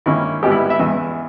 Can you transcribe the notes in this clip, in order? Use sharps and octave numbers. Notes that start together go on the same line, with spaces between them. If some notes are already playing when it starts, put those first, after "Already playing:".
G2 D#3 A#3 C#4 E4
G#1 G#2 G3 B3 G4
E4
E5
E2 C#3 E3 D#5